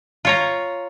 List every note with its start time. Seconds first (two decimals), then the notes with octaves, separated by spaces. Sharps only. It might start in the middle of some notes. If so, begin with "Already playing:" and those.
0.25 F4 C#5 A#5